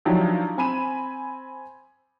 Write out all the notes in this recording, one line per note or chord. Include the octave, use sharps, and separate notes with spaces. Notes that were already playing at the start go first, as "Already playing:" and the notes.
D#3 F3 F#3 D4 E4 G4
C4 G#5 B5 D#7 E7